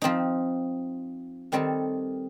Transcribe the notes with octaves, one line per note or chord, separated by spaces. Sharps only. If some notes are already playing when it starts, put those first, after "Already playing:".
F3 C4 D#4
D#3 G3 C4 D#4 A4